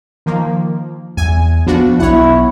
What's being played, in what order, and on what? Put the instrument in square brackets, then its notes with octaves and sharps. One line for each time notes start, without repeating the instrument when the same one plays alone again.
[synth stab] D#3 F3 A#3
[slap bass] E2 [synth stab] G#5
[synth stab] F3 D4 F#4 [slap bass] B3
[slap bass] B1 B3 [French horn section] E4 [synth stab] C#5 F#5